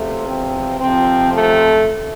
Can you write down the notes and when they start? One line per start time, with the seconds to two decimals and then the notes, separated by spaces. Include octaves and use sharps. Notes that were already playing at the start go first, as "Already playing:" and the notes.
Already playing: E2 C3 F3 A3
0.26 C4
0.79 F2 C3 F3 C4
1.33 A3